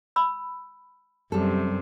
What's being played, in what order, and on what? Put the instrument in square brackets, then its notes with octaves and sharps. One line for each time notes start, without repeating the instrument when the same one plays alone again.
[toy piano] B5 E6
[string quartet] F#2 C3 [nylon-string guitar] G3 A4